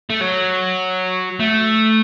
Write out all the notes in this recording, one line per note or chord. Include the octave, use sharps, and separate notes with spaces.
A3
F#3
A3